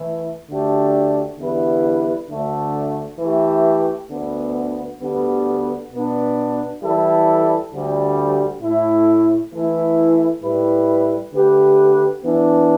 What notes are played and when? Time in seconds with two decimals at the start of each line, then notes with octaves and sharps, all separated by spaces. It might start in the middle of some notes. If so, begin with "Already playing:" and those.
Already playing: E3 A3 E4
0.49 D2 D3 A3 D4 G4
1.38 E2 D3 G3 E4 B4
2.28 D2 D3 A3
3.19 E3 A3 G4
4.10 D2 D3 B3
5.00 D2 D3 G3 B3
5.91 B2 B3 D4
6.81 E3 G3 E4 A4
7.72 D2 D3 G3
8.61 A2 A3 E4
9.52 E3 A3 E4
10.42 A2 G3 E4 B4
11.32 D3 A3 G4 B4
12.23 E3 B3 D4